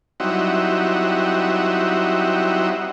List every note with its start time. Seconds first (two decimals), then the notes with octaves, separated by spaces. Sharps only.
0.20 F#3 G3 C4 D#4 E4 F#4